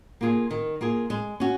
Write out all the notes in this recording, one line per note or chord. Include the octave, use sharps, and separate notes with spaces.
A#3 F4 G#4
D#3
A#3 F4 G#4
G#3
C#4 F#4